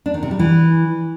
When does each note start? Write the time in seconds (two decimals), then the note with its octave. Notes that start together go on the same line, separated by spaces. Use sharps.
0.06 D4
0.14 D#3
0.23 C3
0.31 G3
0.39 E3